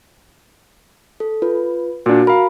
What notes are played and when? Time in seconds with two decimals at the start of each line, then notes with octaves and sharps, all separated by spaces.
1.20 A4
1.42 F4 B4
2.06 A#2 D4 F#4
2.27 A#4 F5 B5